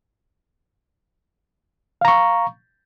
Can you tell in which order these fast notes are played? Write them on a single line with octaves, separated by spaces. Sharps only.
F5 A#5 C#6